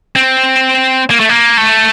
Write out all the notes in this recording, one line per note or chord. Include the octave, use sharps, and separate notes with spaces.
C4
A#3
A3
A#3
A3